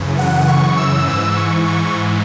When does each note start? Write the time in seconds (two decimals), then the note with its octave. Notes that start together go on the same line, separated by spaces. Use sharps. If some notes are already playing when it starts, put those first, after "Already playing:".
Already playing: F#2 C#3 E3
0.19 F#5
0.48 C#6
0.77 E6
1.07 G#2 E3 E6
1.36 C#6
1.65 C#6